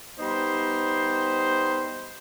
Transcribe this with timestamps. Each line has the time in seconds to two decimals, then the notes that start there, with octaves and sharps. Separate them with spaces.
0.18 G3 B3 D#4 C5